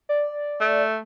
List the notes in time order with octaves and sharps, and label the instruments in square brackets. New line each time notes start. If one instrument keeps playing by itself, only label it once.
[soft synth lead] D5
[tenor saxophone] A3